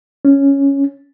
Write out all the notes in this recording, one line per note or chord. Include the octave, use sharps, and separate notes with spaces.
C#4